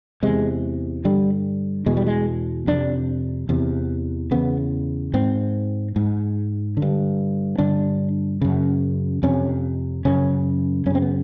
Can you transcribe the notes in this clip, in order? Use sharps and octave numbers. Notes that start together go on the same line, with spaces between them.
E2 C3 G#3
G2 D3 G3
E2 B2 G#3
G3
G#3
F2 C3 D4
E2 C3
E2 C#3 B3
G#2 C4
G#2
D3
G2
G2 D3 D4
F#2 C#3
F2 C3 C#4
F#2 C#3 C#4
F#2 C#3 C4 C#4
B3